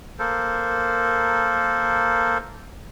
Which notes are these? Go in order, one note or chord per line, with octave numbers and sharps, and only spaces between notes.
A#3 A4 A#4 C5